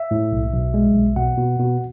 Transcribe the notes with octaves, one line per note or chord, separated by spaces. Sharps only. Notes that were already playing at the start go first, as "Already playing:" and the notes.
Already playing: E5
A2
B1
B1
G#3
B1
B2 F#5
B2
B2